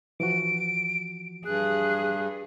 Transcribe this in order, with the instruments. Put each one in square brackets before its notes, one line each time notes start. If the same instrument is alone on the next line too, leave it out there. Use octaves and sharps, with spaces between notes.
[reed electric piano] E3 F3 F#4 [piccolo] D7
[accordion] G2 [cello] G#4 [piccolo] F#6